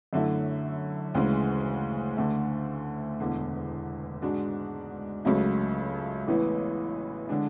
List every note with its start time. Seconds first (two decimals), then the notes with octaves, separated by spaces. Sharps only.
0.13 F#2 D3 A3 E4
1.14 D2 C#3 E3 G#3
2.17 D2 D3 A3
3.20 E1 E2 D3
4.22 G#2 G#3 D4 F#4
5.25 C#2 C#3 F#3 A3
6.27 A1 A2 E3 B3
7.29 D3 G#3 D4